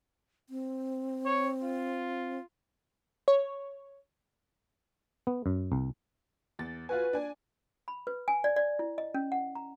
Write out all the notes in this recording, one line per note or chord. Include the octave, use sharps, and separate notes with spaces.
C4
C#5
F4
C#5
B3
F#2
C2
E2 A6
F4 F#4 B4 G#5
D4 G#5
B5
B4
G#5
D5
D5
E4
D#5
C#4
F#5
A#5